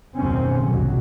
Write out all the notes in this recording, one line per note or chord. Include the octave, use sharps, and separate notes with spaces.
F#1 D#2 B2 C4 C#4
B1 F2 G#2 C3 F#3